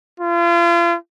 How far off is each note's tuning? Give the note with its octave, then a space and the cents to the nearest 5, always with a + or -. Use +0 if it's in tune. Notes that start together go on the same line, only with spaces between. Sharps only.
F4 -35